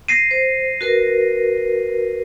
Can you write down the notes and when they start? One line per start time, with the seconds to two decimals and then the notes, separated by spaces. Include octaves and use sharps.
0.08 A#6 C7 D#7
0.31 C5
0.81 F#4 A#4 B4